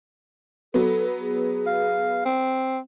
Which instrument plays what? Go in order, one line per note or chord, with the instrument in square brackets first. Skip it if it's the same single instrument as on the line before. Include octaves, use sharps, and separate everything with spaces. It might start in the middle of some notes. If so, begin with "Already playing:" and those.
[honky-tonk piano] F#3 B3 [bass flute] A4
[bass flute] G#4
[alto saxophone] F5
C4